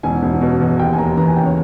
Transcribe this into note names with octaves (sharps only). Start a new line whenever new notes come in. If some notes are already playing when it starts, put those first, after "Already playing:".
E1 G#5
E1
B2
E2
D#2 G5
G#5
D#2 A#5
E3 A#5
G#5
C#3 G5
C#5